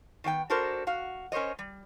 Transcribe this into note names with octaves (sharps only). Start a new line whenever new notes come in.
D#3 B3 D#5 G5
D4 F#4 A4 A#4 C5
F#4 F5
C#4 A#4 C5 C#5 D#5
G3